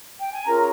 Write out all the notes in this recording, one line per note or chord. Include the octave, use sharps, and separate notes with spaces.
G5
G#5
C#4 F4 G#4 A#4 A#5